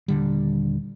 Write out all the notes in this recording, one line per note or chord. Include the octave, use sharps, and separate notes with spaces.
D#1 D3 G3